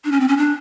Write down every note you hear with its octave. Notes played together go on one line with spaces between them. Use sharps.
D4
C#4
C4
C#4
D4